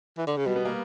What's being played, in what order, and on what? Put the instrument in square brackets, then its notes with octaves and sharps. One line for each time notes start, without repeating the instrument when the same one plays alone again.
[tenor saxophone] E3
D3
C#3
[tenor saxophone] B2 [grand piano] G3
[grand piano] B3
A#3